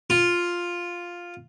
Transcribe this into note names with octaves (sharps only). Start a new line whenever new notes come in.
F4